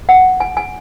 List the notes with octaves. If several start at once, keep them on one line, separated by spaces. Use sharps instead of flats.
F#5
G#5
G#5